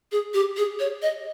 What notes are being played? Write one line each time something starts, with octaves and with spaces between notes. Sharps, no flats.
G#4
G4
G#4
C#5
D#5